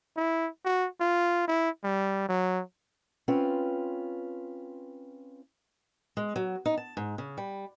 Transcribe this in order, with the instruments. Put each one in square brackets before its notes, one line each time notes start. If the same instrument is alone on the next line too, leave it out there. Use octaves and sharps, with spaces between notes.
[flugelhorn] E4
F#4
F4
E4
G3
F#3
[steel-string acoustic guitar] C4 C#4 F4 B4
G#3
F#3
D#4
A5
G#2
C#3
G3